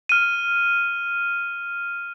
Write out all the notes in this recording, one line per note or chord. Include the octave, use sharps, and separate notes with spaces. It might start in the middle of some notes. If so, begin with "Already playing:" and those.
F6 D#7